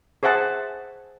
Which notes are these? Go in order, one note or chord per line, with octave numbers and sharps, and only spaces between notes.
G#4 C5 E5 F#5 A5